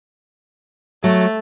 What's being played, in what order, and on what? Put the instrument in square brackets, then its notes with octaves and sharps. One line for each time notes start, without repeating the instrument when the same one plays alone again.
[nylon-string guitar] F#3 [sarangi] A3